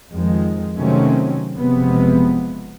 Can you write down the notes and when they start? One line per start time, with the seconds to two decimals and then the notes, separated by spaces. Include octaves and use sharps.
0.11 F2 D#3 F3 G#3
0.76 C3 D#3 F#3 A3 C4 C#4
1.57 F#1 C3 F3 G#3 B3